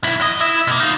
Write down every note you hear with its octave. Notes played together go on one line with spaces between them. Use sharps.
B1 E4
E2 D#5
E4 E5
B2 A#3
D#4 F4